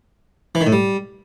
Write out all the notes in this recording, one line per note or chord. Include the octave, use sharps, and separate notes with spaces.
E3
D#3
A2
G3